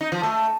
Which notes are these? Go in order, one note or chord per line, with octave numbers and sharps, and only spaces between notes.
D#4
F3
A3